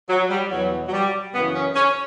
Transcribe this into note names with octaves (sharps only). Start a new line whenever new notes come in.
F#3
G3
E2 B2 F#3
F#3
G3
F#2 C#3 E3 B3
C#4
C#4